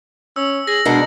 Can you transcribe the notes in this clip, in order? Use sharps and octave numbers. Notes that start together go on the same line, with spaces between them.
C#4 E6
G#4 A#6 F#7
B2 G#3 D4 A#4 F#5